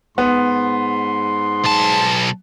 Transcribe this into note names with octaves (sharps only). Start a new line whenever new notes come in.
G#2 B3 C6
B1 A5